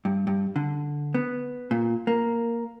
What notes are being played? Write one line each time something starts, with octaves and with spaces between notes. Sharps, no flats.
G2
G2
D3
B3
A#2
A#3